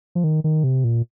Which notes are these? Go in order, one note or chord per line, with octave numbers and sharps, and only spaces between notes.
F3
D#3
D#3
C3
A#2